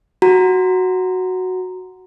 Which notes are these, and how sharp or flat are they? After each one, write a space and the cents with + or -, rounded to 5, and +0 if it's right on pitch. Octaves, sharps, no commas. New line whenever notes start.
F#4 +0 A#5 +0